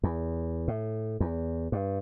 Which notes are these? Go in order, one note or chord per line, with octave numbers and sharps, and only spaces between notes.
E2
A2
E2
G2